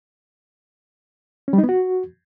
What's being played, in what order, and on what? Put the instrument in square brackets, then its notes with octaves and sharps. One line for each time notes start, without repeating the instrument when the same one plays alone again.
[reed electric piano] C#4
G3
D#4
B3
F#4